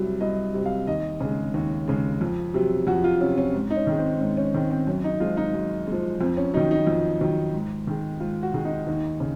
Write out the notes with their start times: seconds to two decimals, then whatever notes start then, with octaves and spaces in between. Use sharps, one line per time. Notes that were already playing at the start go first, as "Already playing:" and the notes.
Already playing: C2 C3 F#3
0.20 C2 D#5
0.54 C3 F#3
0.66 F5
0.87 D#2 D#5
1.21 C#3 G#3
1.54 D#2
1.88 C#3 G#3
2.21 F2
2.54 C3 F#3
2.87 F2 F#4
3.04 F4
3.21 C3 F#3 C#4
3.38 C#4
3.54 G#2
3.70 D#4
3.76 C#4
3.87 D#3 G#3
3.99 C4
4.21 G#2 C#4
4.37 C#4
4.54 D#3 G#3 C4
4.71 C4
4.87 F#2 C#4
5.04 D#4
5.20 F3 G#3 F4
5.37 D#4
5.54 F#2
5.87 F3 G#3
6.20 F2 C4
6.37 C#4
6.54 F#3 D#4
6.57 D#3
6.71 D#4
6.87 F2
7.21 D#3 F#3
7.54 G#2
7.87 D#3 G#3
8.20 G#2 F4
8.43 F#4
8.54 D#3 G#3
8.65 D#4
8.87 D#2
9.20 C#3